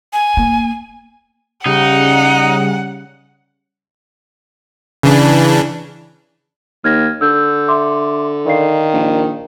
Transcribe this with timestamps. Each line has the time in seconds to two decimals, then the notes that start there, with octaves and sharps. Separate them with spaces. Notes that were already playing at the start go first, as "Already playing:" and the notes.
0.13 G#5
0.37 A#3
1.66 C#3 G3 D#4 F#5
5.03 C#3 E3 D4
6.84 D#2 F6 G#6 A#6
7.21 D3 E6 G6
7.68 E5 C6 D6
8.46 D#3 D5 F5 C7
8.94 A#1